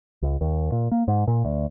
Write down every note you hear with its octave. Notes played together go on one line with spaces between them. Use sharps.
C#2
D#2
A#2
A#3
G#2
A#2
D2